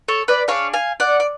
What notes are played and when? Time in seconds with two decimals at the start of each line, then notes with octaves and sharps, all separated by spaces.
0.08 A4 C#5
0.28 B4 D5
0.48 D4 G#4 C#5 F5
0.73 F5 G#5
1.00 D5 F#5
1.20 D5